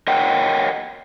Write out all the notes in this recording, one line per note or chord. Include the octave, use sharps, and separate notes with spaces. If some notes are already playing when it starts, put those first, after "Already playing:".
A#4 C#5 D#5 F#5 G5